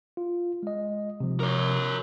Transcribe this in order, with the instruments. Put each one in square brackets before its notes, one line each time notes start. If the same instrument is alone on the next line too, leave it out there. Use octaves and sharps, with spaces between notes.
[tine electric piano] F4
G#3 D#5
C3 F3
[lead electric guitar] A#4 C#5